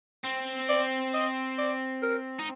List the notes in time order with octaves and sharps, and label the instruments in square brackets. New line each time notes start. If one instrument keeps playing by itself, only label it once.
[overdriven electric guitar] C4
[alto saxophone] D5
D#5
D5
A#4
[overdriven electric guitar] D#4